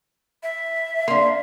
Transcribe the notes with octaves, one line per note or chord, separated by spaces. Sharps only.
E5
A#3 D4 C6